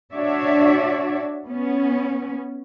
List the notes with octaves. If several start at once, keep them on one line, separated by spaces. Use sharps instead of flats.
D4 F#4 C#5 D5 E5
B3 C#4